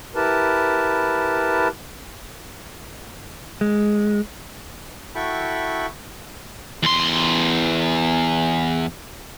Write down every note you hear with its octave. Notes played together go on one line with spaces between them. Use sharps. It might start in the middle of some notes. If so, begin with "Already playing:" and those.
E4 G4 A#4 B4 A5
G#3
E4 F#4 A4 G5 B5 C#6
E2 C6